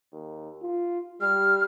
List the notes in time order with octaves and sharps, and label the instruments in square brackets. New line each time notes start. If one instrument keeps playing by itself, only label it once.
[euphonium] D#2
F4
[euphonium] G3 [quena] F6